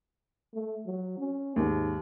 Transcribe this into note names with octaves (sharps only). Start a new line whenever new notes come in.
A3
F#3
C#4
D#2 G#2